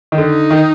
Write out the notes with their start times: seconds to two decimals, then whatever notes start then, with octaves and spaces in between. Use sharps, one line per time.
0.12 D#3
0.18 D3 D#4
0.50 D#3